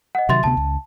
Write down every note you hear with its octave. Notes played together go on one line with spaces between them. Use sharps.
D#5 F#5
C3 D#3 F#3 E5 C6 A6
D2 C3 B3 A5
C#2